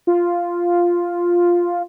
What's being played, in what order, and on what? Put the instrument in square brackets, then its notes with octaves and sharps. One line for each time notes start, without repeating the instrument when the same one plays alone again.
[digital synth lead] F4